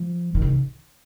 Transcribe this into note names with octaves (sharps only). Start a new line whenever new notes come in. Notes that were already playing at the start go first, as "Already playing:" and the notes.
Already playing: F3
D#3
C#3